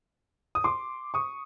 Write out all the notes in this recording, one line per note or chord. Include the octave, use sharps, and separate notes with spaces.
D#6
C6 D6
C#6 D#6